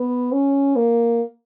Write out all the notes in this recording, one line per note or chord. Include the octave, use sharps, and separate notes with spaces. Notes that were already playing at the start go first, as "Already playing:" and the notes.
Already playing: B3
C#4
A#3